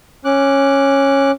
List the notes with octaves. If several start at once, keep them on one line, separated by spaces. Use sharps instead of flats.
C#4 D6 F#6